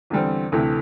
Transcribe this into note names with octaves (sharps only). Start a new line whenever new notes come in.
E2 D3 G3 C4
D2 C3 E3 A3